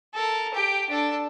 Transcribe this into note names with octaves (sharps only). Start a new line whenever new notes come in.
A4 A#4
G4 G5
D4 A4